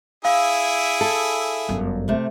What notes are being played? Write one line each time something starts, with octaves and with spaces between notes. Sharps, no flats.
E4 G#4 E5 F5
A4
G1 F#2
C3 A3